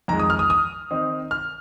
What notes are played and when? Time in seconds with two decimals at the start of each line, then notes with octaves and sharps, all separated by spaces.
0.08 F2 D#3 G#3 A#5
0.19 D#6
0.30 F6
0.39 D#6
0.50 D#6
0.91 D#3 C4 D#4
1.31 F6